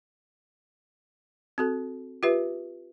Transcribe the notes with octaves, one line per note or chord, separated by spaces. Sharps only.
C4 F#4 A4
F4 G4 B4 E5